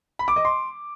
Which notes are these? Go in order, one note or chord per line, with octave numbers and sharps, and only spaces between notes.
B5
D6
D#5
C6